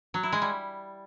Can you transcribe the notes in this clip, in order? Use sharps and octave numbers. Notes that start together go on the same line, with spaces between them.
F#3
E4
G#3
G3